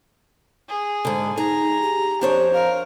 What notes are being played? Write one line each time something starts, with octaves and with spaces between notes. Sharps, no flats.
G#4
G#2 D3
D#4 G#4 A#5
G4
F2 D4 C5 C#5
A#4 F5